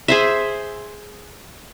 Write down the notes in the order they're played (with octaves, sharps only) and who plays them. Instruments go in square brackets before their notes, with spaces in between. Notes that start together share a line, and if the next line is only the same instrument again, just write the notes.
[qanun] G#4 C5 E5